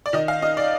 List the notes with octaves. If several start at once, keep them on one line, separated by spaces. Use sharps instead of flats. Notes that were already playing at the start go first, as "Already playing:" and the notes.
D5
D#3 D#5
F5
D#4 D#5
D5